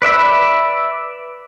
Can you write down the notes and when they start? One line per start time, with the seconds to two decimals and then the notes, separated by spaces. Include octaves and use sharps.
0.02 B4 D5 E5 B5